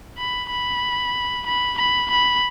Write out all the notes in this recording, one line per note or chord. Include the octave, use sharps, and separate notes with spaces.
B5
B5
B5
B5
B5